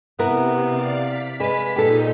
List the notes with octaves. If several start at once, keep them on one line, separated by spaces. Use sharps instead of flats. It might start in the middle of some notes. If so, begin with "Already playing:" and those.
C3 B3 E4 A#4
D5 F5
B6
G#3 B4
A#2 D#4 G4 A4